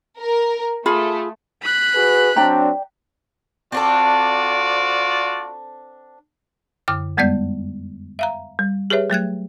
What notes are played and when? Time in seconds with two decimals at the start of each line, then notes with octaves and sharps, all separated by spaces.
0.19 A#4
0.86 A3 F4 G#4 B5
1.63 B5 F#6
1.94 F#4 G#4 B4
2.36 F#3 C4 D4 D5 G5 A#5
3.72 C4 D4 F4 F#4 A4 D5
6.88 F#2 D3 D6 F6
7.17 F2 G3 G#3 B3 D5 G6
8.19 E5 F5 A#5
8.59 G3
8.90 G4 G#4 B4 C#5 E5
9.10 F#3 A3 F#6 G#6